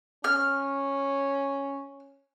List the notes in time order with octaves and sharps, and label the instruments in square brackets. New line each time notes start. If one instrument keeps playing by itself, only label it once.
[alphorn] C#4 [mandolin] F6